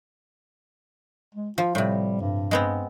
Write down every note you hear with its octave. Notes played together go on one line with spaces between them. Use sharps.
G#3
F3 F4
A2 C3 G3
G2
G#3 B3 C4